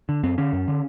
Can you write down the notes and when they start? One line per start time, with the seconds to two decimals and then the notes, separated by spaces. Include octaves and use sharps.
0.09 D3
0.23 F#2 C4
0.38 D3 C#4
0.53 F#2
0.68 D3